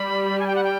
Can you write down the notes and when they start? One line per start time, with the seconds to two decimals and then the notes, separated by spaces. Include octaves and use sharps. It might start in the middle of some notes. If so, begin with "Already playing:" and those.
Already playing: G3 B5
0.39 G#5
0.47 G5
0.55 F#5
0.64 G5